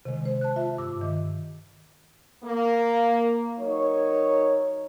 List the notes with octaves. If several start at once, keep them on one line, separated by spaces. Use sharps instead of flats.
C3 D#3 G#3
C5
A5 F#6
F4 E5
G2 D6 E6
D#3
A#3
F#3 D#4 A#4 C#5